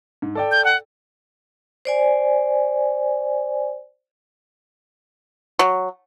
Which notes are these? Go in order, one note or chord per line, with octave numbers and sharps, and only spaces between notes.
G#2
A4 D5 G5
G6
F#5
C5 D5 G#5
F#3